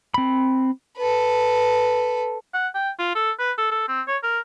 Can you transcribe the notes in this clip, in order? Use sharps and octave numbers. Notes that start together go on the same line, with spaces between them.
C4 B5
A4 B4
F#5
G5
F4
A4
B4
A4
A4
C4
C#5
A#4